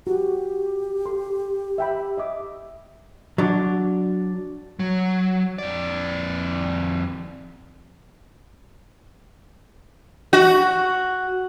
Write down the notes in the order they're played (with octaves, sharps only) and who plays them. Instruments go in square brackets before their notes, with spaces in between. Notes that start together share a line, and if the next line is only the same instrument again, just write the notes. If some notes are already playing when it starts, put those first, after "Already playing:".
[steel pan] F#4 [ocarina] G4
[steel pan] A4 C6
E5 G5 B5
D#5 E5 D6
[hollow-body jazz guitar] F#3 D4
[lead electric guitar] F#3
F2 D5
[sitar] F#4